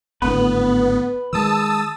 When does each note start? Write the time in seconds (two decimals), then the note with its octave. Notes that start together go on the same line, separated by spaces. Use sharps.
0.22 G#1 A2 D3 B3 B4
1.33 D#3 G#3 A5 D#6 E6